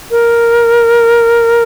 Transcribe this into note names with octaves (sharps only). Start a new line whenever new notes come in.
A#4